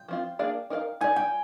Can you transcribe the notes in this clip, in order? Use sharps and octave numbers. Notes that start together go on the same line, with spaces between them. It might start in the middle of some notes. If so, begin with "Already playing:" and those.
Already playing: G5
F3 C4 F4
A#3 D4 G#4 D5 F5
D#4 A#4 D5 F5
D#4 G4 D5 G#5
G5